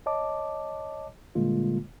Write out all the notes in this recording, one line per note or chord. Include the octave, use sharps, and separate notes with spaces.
C#5 D#5 A5 D6
A#2 D3 G3 G#3 A#3 F4